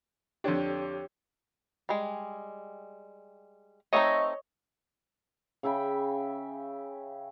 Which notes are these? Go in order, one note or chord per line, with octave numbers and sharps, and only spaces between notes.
F2 D3 D4 G4 C#5
G3 G#3
A3 C4 D#4 C#5 D#5
C#3 E5 G5 B5